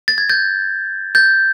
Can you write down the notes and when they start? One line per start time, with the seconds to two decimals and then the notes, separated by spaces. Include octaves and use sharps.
0.08 A6
0.18 G#6
0.29 G6 A6
1.15 G6 A6